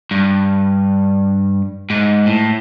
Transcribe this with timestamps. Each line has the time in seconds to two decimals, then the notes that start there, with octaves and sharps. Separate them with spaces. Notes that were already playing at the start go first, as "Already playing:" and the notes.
0.11 G2
1.90 G#2
2.26 A2